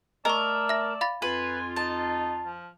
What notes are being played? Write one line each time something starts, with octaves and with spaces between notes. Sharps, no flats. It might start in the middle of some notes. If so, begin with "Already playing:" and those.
A3 A#4 D5 D#5 A5 C#6 E6
E5 A#6
F5 B5 A6
F2 F4 B4 G#5
D#4 A5
F3